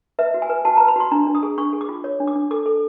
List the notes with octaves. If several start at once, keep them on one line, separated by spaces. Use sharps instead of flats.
B4 E5
F#4
G#5
B4
F#4 A5
A#5
B4
B5
F#4 C6
D4 A#5
D4
D#6
G#4
D4 C#6
G#4
D6
F4
C#5
D4
D6
D4
A4 D6
A4